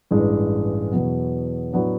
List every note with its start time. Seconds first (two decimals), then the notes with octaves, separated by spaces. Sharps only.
0.11 A1 G2 E3 G#3
0.92 E2 B2 F#3 B3
1.72 A2 F#3 B3 D4